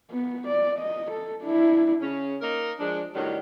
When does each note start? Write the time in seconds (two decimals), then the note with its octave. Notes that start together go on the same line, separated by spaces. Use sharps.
0.11 B3
0.48 D5
0.79 D#5
1.11 A4
1.43 D4 E4
2.01 C#3 C#4
2.42 A#3 D#4 A#4
2.79 F3 G#3 D4
3.14 A2 D#3 F#3 G3 D4